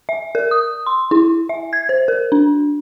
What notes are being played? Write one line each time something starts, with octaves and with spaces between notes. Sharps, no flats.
E5
A#4
D#6
C6
E4
E5
G#6
C5
A#4
D4